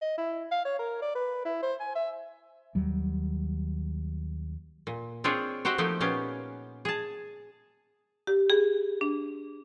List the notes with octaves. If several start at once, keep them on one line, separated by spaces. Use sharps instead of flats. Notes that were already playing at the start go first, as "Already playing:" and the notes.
D#5
E4
F5
C#5
A#4
D5
B4
E4
C5
G#5
E5
D#2 F#3 G3
A#2
C4 D4 F4 G#4 C#5 D5
F#4 G4 C5 D#5 E5 F#5
F3 A3 A#3 D#4 G4
A#2 B3 C#4 G4 F5 G#5
G#4 A5
G4
G#4
D4